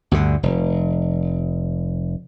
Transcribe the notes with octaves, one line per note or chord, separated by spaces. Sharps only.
D2 G2 D3
F1